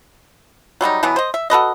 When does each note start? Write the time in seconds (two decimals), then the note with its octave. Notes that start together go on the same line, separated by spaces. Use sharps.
0.81 F#3 G3 A3 D#4
1.03 B2 E3 F#3 B3
1.16 C5 D#5
1.34 E5
1.50 F#4 A4 B4 D#5